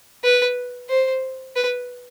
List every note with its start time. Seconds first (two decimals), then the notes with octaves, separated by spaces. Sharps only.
0.24 B4
0.89 C5
1.56 B4